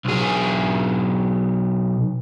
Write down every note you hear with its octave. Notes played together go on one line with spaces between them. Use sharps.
B1 G#4